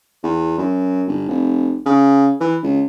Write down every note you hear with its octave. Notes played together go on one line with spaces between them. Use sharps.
E2
F#2
G1
F1
C#3
E3
C#2